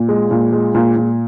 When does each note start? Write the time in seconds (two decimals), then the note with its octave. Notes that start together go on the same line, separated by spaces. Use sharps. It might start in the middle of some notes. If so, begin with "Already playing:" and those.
Already playing: A#2
0.09 G#3
0.31 A#2
0.52 G#3
0.75 A#2
0.96 A#2